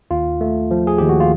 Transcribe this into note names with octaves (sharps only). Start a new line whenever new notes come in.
D#2 F4
A3
F3
G#4
D#2 G4
F#4
F4